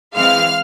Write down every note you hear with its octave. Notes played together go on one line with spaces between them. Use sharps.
E3 G#3 C4 F5 F6